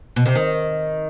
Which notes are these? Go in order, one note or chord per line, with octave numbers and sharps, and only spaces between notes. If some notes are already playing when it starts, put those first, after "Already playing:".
B2
C3
D#3